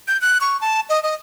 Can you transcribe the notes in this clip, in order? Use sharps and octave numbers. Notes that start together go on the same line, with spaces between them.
G6
F#6
C#6
A5
D#5
D#5